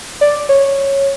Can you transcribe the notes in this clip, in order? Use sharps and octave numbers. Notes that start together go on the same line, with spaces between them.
D5
C#5